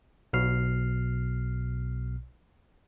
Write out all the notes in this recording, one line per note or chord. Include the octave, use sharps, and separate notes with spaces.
B1 B2 F6 C7